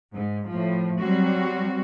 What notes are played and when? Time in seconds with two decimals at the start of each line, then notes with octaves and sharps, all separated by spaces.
0.14 G#2
0.49 A2 F3
1.00 F#3 G3 C4 F#4